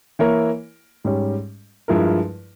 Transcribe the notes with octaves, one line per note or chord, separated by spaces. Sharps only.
E3 A#3 E4 A#4 C#5
G#2 G3 C#4 G4 C#5
G2 F3 G#3 E4 A#4